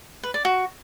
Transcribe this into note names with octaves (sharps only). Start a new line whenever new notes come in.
B4
D5
F#4